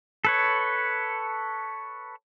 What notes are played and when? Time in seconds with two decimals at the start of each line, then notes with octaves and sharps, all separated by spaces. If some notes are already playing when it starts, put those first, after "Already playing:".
0.25 A4 B4 C#5